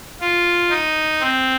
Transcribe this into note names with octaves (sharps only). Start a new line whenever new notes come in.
F4
D#4
C4